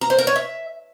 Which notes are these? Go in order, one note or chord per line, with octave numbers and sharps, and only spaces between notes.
A#5
C5
A#4
C#5
E5